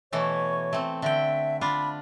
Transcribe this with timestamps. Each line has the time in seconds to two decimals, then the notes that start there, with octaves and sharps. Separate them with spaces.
0.13 B2 E3 A3 C#5
0.73 A3 C4
1.02 D3 E5 G5
1.61 D4 F4 B5